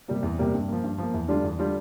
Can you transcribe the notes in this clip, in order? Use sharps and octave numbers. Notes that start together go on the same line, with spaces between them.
C3 G3 A#3
E2
C3 G3 A#3
G2
F3 A#3
G2
F3 A#3
E2
D3 G3 D4 F4
E2
D3 G3 D4 F4